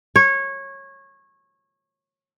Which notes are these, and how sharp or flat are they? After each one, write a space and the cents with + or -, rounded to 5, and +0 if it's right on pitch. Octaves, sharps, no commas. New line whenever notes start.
C#5 -20